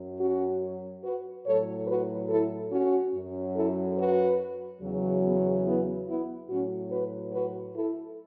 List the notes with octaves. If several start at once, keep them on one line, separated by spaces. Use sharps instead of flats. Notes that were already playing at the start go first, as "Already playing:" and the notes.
Already playing: F#2 F#3
C#4 F#4
F#4 B4
A2 F#3 A4 C#5
F#4 B4
E4 A4
C#4 F#4
F#2 F#3
E4 A4
F#4 B4
E2 C#3 F#3
B3
B3 E4
B3 E4
A2 F#3 C#4 F#4
F#4 B4
F#4 B4
E4 A4